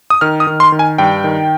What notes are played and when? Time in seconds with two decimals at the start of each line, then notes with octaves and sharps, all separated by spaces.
0.10 D#6
0.21 D#3 F6
0.40 D#6
0.47 D#3
0.60 C6
0.72 D#3
0.79 G#5
0.98 G2 G5
1.24 D#3